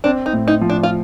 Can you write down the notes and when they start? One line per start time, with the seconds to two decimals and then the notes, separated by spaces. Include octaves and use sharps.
0.04 C4 D4
0.26 D#4
0.33 A2
0.48 D#4
0.61 F3
0.70 D4
0.83 F4